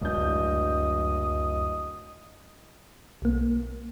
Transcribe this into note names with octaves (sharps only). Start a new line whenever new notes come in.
D1 C#2 F#2 G#3 D4 D#5 G6
B1 A#3